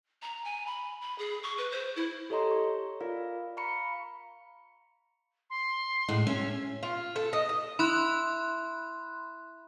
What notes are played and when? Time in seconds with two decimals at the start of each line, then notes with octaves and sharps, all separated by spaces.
0.22 A#5
0.44 G#5
0.66 B5
1.01 B5
1.18 G#4
1.43 C#6
1.58 B4
1.72 C5
1.96 E4
2.30 G4 A4 C#5 D#5 A#5 C6
2.51 C#6
3.01 F4 A#4 D5 F5
3.57 F5 A#5 B5 C#6 C#7
5.50 C6
6.08 A2 G#3
6.27 C#4 E5
6.83 F4
7.16 A4
7.33 D#5
7.49 D#5
7.79 E4 B5 C6 F#6